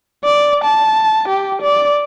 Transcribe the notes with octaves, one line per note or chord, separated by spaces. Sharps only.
D5
A5
G4
D5